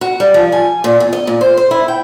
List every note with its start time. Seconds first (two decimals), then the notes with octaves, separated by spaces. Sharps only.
0.01 F#4
0.20 G3
0.34 F3
0.52 G#5
0.84 A#2
1.00 E2
1.13 D#5
1.27 A#2
1.41 C5
1.57 C5
1.71 E4
1.88 G5